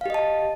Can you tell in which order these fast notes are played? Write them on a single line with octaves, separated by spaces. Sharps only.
F5 G4 D#5 A5